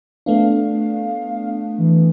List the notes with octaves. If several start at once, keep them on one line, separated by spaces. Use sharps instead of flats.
A3 B3 D4 F5
E3